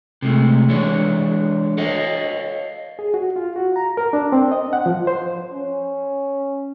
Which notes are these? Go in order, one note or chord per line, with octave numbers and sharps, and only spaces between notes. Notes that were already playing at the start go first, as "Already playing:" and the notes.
C3 G#3 A3
E3 G#3 D4 C#5
A4 C#5 D#5 F5
G#4
F#4
F4
F#4
A#5
A#4
D4
C4
D#5
F#5
F3
C5
C#4